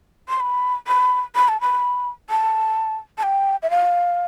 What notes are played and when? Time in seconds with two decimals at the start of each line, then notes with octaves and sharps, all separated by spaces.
0.29 C6
0.40 B5
0.87 B5
1.35 B5
1.48 A5
1.61 B5
2.30 A5
3.18 A5
3.23 G5
3.62 E5
3.70 F5